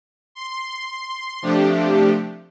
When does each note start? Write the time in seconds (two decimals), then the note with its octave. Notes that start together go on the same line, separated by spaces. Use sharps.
0.35 C6
1.42 C3 F3 A3 D4 G4